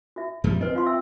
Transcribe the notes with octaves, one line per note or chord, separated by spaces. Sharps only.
F#4 E5
F#2 F3 G3
C4 B4 D#5
F4 F5 C6
E5 G5 E6